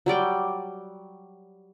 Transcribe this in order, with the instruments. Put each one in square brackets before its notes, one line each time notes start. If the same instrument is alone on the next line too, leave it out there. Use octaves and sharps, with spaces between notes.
[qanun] F#3 G3 D5 G5